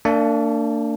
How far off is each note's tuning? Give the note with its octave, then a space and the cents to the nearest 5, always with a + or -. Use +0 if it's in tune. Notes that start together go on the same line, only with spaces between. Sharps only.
A#3 -40 D4 +0 A5 -45